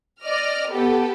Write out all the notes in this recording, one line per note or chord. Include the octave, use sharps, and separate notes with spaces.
D5 D#5 F6
B3 G4 A4